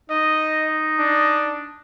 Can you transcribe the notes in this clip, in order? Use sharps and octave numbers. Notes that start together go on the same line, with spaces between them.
D#4 D#5
D4